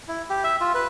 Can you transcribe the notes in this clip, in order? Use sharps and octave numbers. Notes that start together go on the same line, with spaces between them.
E4
G4
E5
F4
B4